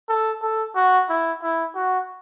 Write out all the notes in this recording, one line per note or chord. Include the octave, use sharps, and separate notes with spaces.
A4
A4
F#4
E4
E4
F#4